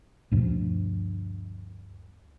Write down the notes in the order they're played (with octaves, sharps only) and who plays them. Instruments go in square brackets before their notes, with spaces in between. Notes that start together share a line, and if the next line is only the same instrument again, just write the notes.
[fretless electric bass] D2 G2 B2 F3